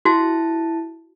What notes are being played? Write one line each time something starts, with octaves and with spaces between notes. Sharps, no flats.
E4 F#4 A5